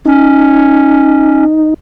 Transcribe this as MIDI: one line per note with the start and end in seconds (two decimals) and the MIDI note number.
0.05 1.45 61
0.05 1.74 63